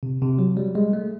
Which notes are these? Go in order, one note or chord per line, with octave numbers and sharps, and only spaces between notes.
C3
C3
F#3
G3
G#3
A3